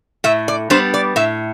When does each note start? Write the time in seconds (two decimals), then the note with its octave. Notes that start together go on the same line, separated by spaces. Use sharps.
0.24 A2 E5
0.48 D5
0.70 G3 B3 D4 C5
0.94 D5
1.16 A2 E5